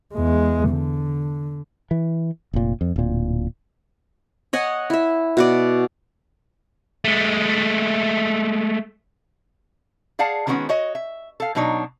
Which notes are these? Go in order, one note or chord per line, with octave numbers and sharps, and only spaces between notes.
E2 G#3
D3
E3
F1 A#2
F2
D1 A#2
C#5 D#5 F#5 G#5
E4 E5
B2 F#4 D5
G#3 A3
G#4 D5 F5 F#5 A5
D3 D#3 G#3 B3 C#4 F#4
F#4 C#5 D#5
E5
A4 F5
B2 F#3 D4 D#4 C#5